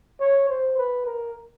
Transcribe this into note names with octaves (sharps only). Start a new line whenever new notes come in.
C#5
C5
B4
A#4